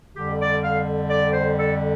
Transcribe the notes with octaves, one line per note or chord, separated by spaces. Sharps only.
F2 D3 G3 G4
D5
F5
D5
C5
A4